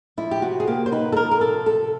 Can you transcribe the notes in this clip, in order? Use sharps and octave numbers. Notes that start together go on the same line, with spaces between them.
F3 E4
G4
C3 F#4
G#4
A#3 G4
C5
D#4 B4
A4
F3 A#4
A#4
C3 A4
C3 A4